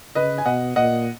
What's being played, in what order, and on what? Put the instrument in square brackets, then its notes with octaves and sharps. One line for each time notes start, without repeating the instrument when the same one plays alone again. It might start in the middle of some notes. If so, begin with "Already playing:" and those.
[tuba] C#3 [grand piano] B4 D#5
[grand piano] G#5
[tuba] B2 [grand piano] D#5 F#5
[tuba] A#2 [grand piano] D#5 F#5